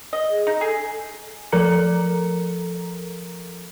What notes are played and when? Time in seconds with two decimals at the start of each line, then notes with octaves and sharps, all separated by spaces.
0.13 D#5
0.30 G#4
0.47 D#4
0.61 G#4 A4
0.75 G#5
1.52 F3 A4 A#4 A#5 C#7